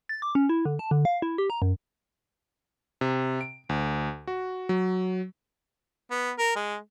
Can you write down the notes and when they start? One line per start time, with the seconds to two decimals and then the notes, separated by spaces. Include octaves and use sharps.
0.09 A6
0.22 D6
0.35 C#4
0.49 E4
0.65 D3
0.79 A5
0.91 D3
1.05 F5
1.22 E4
1.38 G4
1.50 A#5
1.62 F#2
3.01 C3
3.41 D7
3.69 D2
4.27 F#4
4.69 F#3
6.11 B3
6.39 A#4
6.56 G#3